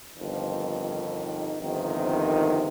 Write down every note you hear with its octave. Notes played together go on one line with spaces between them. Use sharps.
G1 F2 D#3
G1 F2 C3 D#3